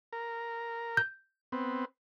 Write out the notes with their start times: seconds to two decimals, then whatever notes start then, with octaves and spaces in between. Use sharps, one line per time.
0.13 A#4
0.97 G6
1.52 B3 C4